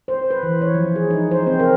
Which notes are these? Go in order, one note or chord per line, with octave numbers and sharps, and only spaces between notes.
C5
B4
E3
C#5
F3
G#4
D#4
C5
C4
A#4